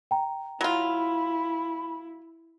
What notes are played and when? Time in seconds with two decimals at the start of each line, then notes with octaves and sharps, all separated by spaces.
0.11 G5 A#5
0.61 F#3 E4 F4 B5